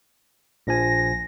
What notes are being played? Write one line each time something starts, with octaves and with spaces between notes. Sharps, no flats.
A#1 F3 G#5 A#6